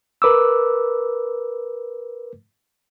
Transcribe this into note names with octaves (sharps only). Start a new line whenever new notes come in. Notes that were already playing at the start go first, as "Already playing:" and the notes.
A#4 B4 D6 E6